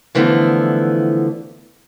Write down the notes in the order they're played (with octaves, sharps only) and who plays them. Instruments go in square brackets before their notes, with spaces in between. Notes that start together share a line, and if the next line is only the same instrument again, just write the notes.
[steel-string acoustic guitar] D3 E3 F3 A3 B3